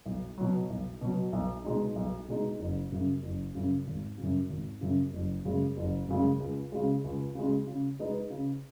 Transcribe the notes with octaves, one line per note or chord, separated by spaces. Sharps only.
B1
B2 F#3
B1
B2 F#3
B1
B2 G#3 D#4
B1
B2 G#3 D#4
F#1
F#2 C#3
F#1
F#2 C#3
G#1
C#3
F#2
G#1
F#2 C#3
F#1
F#2 C#3 G#3
F#1
F#2 C#3 G#3
C#2
C#3 G#3
C#2
C#3 G#3
C#3
G#3 D#4 B4 D#5
C#3